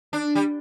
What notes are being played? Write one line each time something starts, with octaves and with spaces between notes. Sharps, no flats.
D4
G3